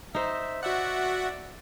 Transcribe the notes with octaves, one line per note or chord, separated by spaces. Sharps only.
D#4 C5 E5
F#4 D5 E5 F#5